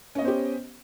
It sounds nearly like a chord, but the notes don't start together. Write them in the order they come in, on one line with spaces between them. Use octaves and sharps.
C#4 D#5 B3 C5 G4